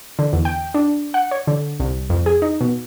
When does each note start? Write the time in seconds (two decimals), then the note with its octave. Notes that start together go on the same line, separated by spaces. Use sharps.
0.19 D3
0.33 E2
0.45 G5
0.74 D4
1.14 F#5
1.31 C#5
1.47 D3
1.80 C2
2.10 F2
2.26 G#4
2.42 D#4
2.61 B2